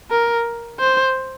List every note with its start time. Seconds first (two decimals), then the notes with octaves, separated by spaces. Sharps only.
0.11 A#4
0.80 C5